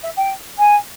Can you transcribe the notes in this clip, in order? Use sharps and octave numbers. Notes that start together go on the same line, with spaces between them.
E5
G5
G#5